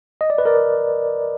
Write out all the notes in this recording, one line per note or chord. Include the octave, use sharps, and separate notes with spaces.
D#5
D5
B4
A#4 D5